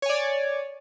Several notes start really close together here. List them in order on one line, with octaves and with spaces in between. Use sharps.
C#5 G#5 D5